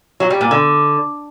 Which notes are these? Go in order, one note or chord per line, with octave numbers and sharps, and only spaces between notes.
F#3
G3
A#2
D3